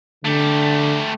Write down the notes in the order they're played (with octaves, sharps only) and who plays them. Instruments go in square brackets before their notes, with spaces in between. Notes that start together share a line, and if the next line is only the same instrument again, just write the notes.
[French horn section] D3 [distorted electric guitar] A3 G4